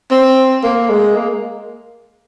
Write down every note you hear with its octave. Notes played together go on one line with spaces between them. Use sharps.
C4
A#3
G#3
A#3